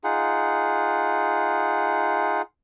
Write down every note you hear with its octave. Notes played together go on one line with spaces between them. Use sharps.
D#4 F4 G#4 F#5